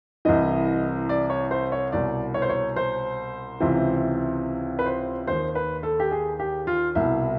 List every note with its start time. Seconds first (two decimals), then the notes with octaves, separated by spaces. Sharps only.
0.25 C2 C3 E3 D#5
1.09 D5
1.30 C#5
1.51 C5
1.72 C#5
1.92 C2 B2 D5
2.34 C#5
2.42 C5
2.49 C#5
2.76 C5
3.60 C#2 C3 E3
4.79 B4
4.86 C5
5.27 D#2 D#3 C5
5.55 B4
5.83 A4
6.00 G4
6.11 G#4
6.39 G4
6.67 F4
6.95 C2 B2 E4